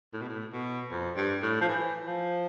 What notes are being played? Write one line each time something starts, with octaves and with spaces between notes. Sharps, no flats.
A2
B2
A2
B2
F2
G2
A2
F3
E3
F3